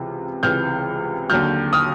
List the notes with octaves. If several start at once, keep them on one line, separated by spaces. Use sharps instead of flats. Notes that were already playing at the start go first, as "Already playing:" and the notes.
Already playing: C#2 C3 E3
C#2 C3 E3 F6 G6
D#2 D3 F#3 F6 G6
D#6 F6